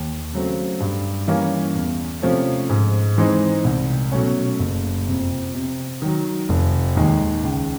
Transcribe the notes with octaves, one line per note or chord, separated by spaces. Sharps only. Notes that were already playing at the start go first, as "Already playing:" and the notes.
Already playing: D#2
C#3 F#3 A3 C4
G2
E3 G3 A#3 C#4
E2
C3 F3 A3 C#4
G#2
E3 G#3 C4 D#4
C2
B2 F#3 A3 C#4
F#1
F2 C3
C3
D#3 F#3
F1
D#2 D#3 G#3
C#2